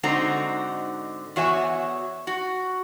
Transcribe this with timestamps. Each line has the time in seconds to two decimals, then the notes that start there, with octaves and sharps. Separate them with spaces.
0.03 G#2 D3 C4 D#4 F#4 A#5
1.36 E2 F#4 C#5 E5 G#5
2.27 F#4